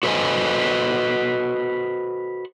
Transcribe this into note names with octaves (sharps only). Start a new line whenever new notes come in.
F#4 A4 B4 C5 D#5 G#5